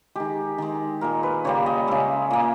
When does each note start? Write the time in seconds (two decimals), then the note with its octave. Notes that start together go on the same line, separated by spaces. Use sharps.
0.15 D#3 G#3 G4
0.58 D#3 G#3
1.01 A#2 G#3 A#4
1.23 B4
1.45 C#3 G3 A#3 C#5
1.66 D#5
1.87 C#3 G#3 E5
2.31 A#2 A#3